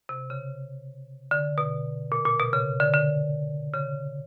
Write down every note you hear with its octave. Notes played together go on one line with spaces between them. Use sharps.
C3
C#3
D3
B2
A#2
A#2
B2
C#3
D3
D3
C#3